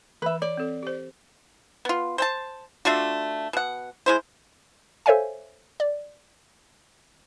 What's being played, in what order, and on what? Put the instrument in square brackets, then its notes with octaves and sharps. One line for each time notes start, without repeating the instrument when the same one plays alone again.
[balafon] E3 [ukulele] B4 E5
[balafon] C#5 [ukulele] D5
[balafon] C4 A4
G4 C5
[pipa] B3 F4
C5 G5 A5
A3 D4 F4 F#4
B2 F#5
G#3 E4 C5
[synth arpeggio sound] A4 C5 C#5 E5 F5 G#5
D5